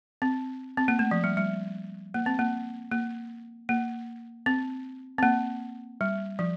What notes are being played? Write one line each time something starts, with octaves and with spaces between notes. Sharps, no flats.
C4
C4
A#3
A3
F3
G3
G3
A#3
C4
A#3
A#3
A#3
C4
C4
A#3
G3
F3